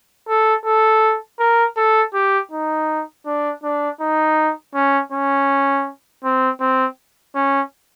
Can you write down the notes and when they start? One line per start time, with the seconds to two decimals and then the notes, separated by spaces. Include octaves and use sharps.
0.28 A4
0.65 A4
1.39 A#4
1.77 A4
2.14 G4
2.51 D#4
3.26 D4
3.63 D4
4.01 D#4
4.75 C#4
5.12 C#4
6.24 C4
6.60 C4
7.35 C#4